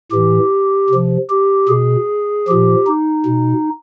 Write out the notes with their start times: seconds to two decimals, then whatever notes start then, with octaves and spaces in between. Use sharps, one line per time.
0.11 A2 E3 G4
0.89 C3 F3
1.29 G4
1.69 B2 G#4
2.48 A#2 F3 G4
2.87 D#4
3.26 B2